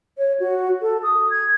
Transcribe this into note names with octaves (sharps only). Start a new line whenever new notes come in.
C#5
F#4
A4
D#6
G#6